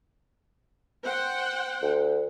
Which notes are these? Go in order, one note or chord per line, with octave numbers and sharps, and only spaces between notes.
C5 F#5 G5
D2